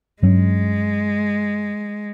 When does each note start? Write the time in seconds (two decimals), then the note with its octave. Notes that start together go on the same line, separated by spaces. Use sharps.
0.22 G2 F#3 G#3 C#4